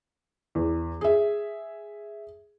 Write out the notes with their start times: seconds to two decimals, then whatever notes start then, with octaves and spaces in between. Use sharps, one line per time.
0.55 E2
1.01 G#4 E5